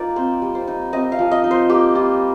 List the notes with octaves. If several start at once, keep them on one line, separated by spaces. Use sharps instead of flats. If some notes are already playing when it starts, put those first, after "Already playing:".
Already playing: A#3 D#4 F4 D5
C4 C5
G3
C5
D#4
C4 D#5
F5
F3
D#5
D#4
C5
A#3 G4
G3 F4